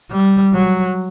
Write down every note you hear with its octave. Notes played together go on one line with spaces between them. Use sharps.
G3
F#3